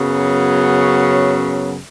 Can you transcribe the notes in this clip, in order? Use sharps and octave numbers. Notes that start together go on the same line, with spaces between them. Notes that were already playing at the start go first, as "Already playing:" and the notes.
Already playing: F#2 C#3 F#3 B3